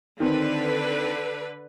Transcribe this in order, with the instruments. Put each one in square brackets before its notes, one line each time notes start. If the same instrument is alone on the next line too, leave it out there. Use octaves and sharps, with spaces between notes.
[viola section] D3 B4 [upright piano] D#3 C4